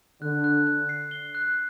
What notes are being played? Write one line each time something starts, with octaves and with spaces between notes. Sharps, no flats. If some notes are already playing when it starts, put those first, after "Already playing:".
D3 F#6
F#6
F#6
C7
G7
F#6